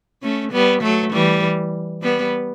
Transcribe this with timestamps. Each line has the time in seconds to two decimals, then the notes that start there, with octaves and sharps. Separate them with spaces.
0.22 A3 C#4
0.52 G3 B3
0.82 F#3 A3
1.12 E3 G3
2.02 G3 B3